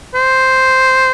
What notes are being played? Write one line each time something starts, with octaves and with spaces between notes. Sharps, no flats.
C5